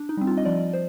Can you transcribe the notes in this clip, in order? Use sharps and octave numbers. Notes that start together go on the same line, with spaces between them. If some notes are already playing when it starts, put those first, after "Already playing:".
Already playing: D4
D#4
G3 C4
F4
D#5
F3 D5
C5